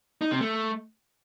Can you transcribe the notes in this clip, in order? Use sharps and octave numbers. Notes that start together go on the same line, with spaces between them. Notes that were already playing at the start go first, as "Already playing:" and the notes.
D#4
C3
A3